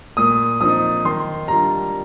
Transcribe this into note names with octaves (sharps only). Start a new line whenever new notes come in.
A#2 D#6
F3 C4 D#4 D#6
D#3 C6
G3 D4 F4 A#5